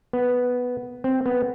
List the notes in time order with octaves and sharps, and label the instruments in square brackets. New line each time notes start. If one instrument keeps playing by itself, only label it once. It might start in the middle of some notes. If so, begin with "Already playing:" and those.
[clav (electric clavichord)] B3
C4
B3